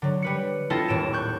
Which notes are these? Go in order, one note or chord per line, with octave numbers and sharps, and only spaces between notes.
D3 F#3
G3 B4 C#7
C4 E4 F4 A4 D#5 A5
D#1 A2 D7 E7
C#6 F#6 G6